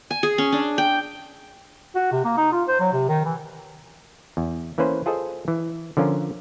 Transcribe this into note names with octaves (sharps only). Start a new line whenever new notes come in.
G#5
G#4
C#4
D4
G5
F#4
C3
A#3
D#4
F4
C5
F#3
C3
D#3
E3
E2
E3 A#3 C#4 B4 C5
F4 G#4 A4 C5 D#5
E3
D3 F3 C#4 F4 A#4